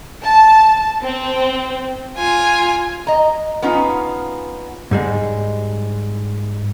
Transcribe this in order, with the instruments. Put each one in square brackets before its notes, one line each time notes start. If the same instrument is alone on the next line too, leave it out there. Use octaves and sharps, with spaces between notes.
[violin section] A5
C4
[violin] F4 G#5
[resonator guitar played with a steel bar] D#5 A#5
B3 C#4 D#4 F4
[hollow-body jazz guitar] G#2 G3 G#3